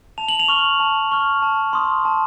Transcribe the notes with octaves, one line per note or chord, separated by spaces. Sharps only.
A5 F7
F#7
F7
C#6 F6
A5
C#6 F6
A5
C6 D#6
A5